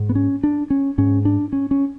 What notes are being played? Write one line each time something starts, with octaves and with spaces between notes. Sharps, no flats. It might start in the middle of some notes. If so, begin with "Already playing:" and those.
Already playing: G#2
B3
C#4
D4
C#4
G#2 C#4
D4
C#4
C#4